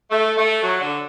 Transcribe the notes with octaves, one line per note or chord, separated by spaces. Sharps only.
A3
A3
F#3
D3